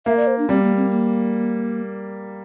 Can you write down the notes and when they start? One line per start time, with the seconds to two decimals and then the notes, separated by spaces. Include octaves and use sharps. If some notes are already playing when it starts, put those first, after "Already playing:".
0.06 A#3 E5
0.17 D5
0.27 C5
0.38 D4
0.49 G3 C4
0.63 A#3
0.77 C4
0.91 A#3